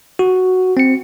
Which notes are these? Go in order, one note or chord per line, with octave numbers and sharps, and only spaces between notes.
F#4
C4 C#7